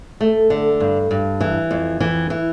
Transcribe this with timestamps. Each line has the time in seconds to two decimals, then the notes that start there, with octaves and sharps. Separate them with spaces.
0.21 A3
0.50 D3
0.80 G2
1.11 G2
1.41 E3
1.71 F2
2.00 E3
2.30 E3